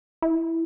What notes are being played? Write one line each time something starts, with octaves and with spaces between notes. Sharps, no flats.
E4